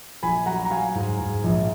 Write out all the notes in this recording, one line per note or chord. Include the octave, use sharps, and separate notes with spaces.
A#1 G#5 B5
F#3 F#5 A#5
A#5
F#3 F5 G#5
G#2
G#2
A#1